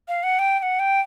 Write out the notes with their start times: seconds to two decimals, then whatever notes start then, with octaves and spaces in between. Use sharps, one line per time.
0.08 F5
0.23 F#5
0.39 G5
0.59 G5
0.62 F#5
0.79 G5